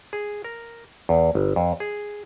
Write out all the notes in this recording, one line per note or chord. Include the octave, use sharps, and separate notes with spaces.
G#4
A#4
E2
G1
F2
G#4